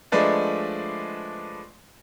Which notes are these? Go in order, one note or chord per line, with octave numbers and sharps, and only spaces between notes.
F3 G#3 A3 D4 B4 D5